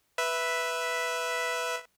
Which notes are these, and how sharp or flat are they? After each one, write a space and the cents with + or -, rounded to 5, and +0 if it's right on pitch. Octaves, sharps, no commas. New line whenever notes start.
B4 +0 E5 +0